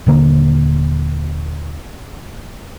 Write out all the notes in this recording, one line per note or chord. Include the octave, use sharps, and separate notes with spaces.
D#1 D3 A#3